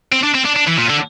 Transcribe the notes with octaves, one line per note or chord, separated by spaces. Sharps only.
C4
D4
C4
D4
D4
E3
A#2
D3